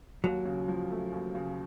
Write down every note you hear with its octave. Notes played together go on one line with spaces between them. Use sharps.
D#2 F#3
C#3
F3
A3
D#2
C#3